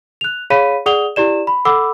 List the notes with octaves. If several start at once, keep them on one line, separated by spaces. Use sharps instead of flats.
F#6 F7
G#4 C#5 F5 B5 B6 D#7
G#4 D5 F#5 D#6 F7 G7
E4 G4 D5 E7
B5
A4 F#5 B5 D6 E6